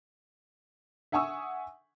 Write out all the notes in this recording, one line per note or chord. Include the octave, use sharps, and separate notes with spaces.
E5 F#5 G#5 C#6 D#6 E6